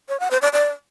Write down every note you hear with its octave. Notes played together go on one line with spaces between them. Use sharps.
C#5
F#5
C5
D5
D5